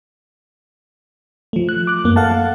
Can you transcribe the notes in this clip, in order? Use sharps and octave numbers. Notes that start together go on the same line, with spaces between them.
F3 A3
F#6
D6 F#6
F#2 A#3
A4 F5 F#5 A5